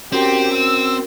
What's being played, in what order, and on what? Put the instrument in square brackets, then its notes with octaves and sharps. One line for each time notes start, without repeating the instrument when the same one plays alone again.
[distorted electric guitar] C4 [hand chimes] C#4 F#4 A#4 [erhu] G4
[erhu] E6